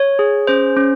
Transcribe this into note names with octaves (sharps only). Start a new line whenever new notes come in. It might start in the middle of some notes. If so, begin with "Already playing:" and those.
Already playing: C#5
G#4
C#4 C5
C#4